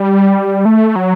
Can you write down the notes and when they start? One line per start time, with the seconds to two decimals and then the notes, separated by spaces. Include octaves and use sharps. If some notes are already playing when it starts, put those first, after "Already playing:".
Already playing: G3
0.65 A3
0.96 F#3